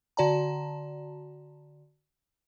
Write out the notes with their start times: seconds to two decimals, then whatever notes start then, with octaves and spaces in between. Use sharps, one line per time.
0.17 D3 F#4 D5 A5 A#5